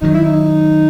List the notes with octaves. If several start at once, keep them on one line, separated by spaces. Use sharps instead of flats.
F#2 D#3 F#3 D#4
E4
D#4